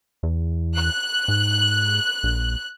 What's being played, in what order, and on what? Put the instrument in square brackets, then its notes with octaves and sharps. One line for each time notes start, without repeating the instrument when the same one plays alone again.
[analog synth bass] E2
[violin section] F#6
[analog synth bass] G#2
A#1